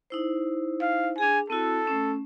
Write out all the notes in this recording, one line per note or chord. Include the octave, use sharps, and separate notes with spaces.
D#4 E4 C5
F5
D4 G#4 G#5
C4 E4 F#4 A4
A3 C#4